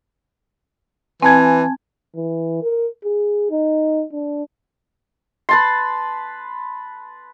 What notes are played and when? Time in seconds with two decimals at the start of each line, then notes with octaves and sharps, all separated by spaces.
1.22 E3 C4 G#5 A5 G#6
2.16 E3
2.63 A#4
3.05 G#4
3.51 D#4
4.13 D4
5.49 B4 A5 C6